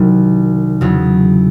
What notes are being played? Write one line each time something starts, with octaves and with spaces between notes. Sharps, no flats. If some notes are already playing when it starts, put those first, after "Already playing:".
Already playing: C2 C3 D#3 F#3
E2 C#3 F#3